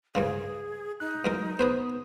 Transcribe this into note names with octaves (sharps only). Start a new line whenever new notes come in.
C2 G2 C#3 G#4
D#4 F#6
E2 F#3 G#3 A#4
B3 G#4 B4 C5 D#6